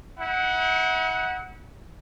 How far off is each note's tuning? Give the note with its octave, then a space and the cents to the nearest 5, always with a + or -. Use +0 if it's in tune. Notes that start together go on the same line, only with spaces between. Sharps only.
E4 -45 F#5 +0